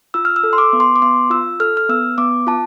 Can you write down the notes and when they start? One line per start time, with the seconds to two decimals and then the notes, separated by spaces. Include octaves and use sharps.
0.14 F4 E6
0.25 F6
0.36 E6
0.44 A4
0.53 C6
0.58 D6
0.73 B3
0.80 C6
0.96 D6
1.02 B3 C6
1.30 F4 E6
1.60 A4 F6
1.77 F6
1.89 B3 E6
2.18 B3 D6
2.47 F4 A5